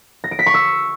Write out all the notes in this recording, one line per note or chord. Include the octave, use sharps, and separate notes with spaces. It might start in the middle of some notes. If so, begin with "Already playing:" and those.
A#6
D7
B6
C#6
E6